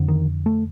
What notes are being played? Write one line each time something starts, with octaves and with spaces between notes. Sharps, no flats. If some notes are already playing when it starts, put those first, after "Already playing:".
Already playing: F2 D3
D#3
A3